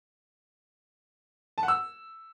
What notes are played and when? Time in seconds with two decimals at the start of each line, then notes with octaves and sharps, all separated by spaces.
1.58 A5
1.63 F#5
1.68 E6